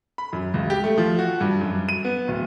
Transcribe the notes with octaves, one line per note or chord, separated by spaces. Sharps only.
B5
F#2
C#2
G4
A3
F3
F#4
G2
F#2
D#7
B3
D1